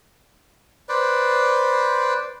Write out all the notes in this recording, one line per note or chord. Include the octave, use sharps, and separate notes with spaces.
B4 C5 D5